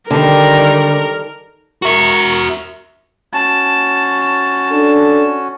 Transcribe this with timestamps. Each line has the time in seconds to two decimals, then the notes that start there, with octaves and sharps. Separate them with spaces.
0.10 D3 D#3 G3 C4 A#4
1.82 F#4 A#4 E5 C#6
3.33 C#4 F#4 A5
4.70 D4 A4